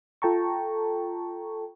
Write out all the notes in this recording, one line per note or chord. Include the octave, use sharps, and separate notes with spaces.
F4 A4 G5 A5 A#5 C#6